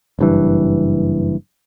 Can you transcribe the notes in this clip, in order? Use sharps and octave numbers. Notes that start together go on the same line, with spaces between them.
F#1 G2 E3